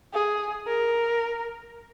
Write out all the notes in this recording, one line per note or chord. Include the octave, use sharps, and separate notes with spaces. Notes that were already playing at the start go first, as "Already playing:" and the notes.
G#4
A#4